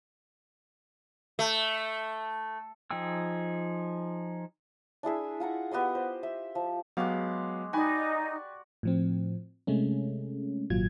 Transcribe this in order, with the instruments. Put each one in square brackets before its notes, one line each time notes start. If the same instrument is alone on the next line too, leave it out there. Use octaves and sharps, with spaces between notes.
[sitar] A3
[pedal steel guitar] F3 D#4 G#4 G5 E6
[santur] D4 E4 G#4 E5
F4 F#5 A#5 C#6
B3 G4 D#5 C6
C5
E5
F3
[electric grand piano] F#3 B3 F5 [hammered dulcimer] G#3 F#4 G4
[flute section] D#4 [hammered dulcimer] F#4 D5 [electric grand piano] G5 G#5 B5
[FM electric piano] A2 F3 C4
C3 G#3 A3 C#4
G#1 A#2 F#3 F4 G#6